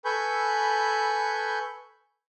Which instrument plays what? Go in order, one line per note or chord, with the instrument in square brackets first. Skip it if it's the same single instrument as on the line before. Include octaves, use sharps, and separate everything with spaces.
[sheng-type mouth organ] A4 B4 G#5 B5 C#6 G6